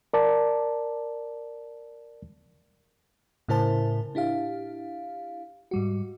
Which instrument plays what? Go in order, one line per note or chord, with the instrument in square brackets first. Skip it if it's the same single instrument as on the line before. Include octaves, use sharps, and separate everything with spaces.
[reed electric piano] A#4 D5 A5
[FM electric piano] A2 C#3 E4 A#4 C5 A5
D4 E4 G4 F5
G#2 G3 F#4